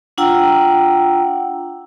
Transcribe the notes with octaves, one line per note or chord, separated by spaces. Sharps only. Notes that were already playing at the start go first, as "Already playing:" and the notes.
D4 F4 F#5 G5 A#5 E6